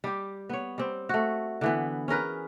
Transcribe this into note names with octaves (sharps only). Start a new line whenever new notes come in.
G3 G4
B3 C#5
G3 C4
A3 F#4
D3 E3 B3
C#4 G#4 A#4 B4